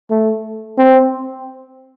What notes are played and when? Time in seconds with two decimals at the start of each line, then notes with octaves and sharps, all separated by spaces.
0.10 A3
0.78 C4